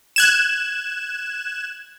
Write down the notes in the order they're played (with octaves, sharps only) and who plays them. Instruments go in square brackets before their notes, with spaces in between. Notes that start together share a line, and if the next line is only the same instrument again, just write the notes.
[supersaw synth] F#6 G#6 E7